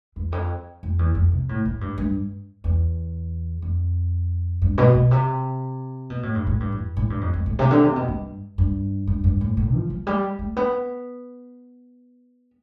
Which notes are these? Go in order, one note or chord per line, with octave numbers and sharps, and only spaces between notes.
E2
F2
F2
E2
F2
C3
A2
A2
G2
G2
E2
F2
G2
B2
B2
C3
B2
A2
G2
A2
G2
E2
A2
G2
F2
F2
A2
C3
D3
C3
B2
G2
G2
G2
G2
A2
A2
F3
F3
G3
A3
B3